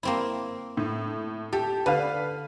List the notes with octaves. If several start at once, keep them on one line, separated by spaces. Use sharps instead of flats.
A#3 C4 E4
A2
G4 A4
D3 B4 F5